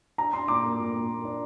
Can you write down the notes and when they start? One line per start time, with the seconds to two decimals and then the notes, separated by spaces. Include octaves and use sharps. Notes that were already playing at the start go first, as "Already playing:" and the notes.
0.18 D4 A#5
0.33 D4 C6
0.48 A#2 D6
0.64 A#3
0.80 A#2
0.94 A#3
1.09 A#3
1.25 D4